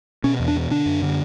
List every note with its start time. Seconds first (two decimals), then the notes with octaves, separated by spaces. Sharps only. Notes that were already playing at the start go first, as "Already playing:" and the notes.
0.24 B2 C#4
0.40 E2
0.48 D4
0.55 B2
0.71 D3 D4
0.86 F#2
1.03 D3